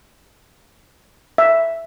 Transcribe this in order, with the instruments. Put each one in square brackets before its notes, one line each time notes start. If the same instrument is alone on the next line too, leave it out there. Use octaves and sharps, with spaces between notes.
[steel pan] E5